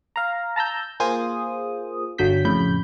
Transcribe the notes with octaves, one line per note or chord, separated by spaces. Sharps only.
F5 A#5
A5 A#5 E6 G6
A#3 F4 G#4 C5 D#6
G1 D3 F#3 G6 B6
F2 A2 C#3 B5 G6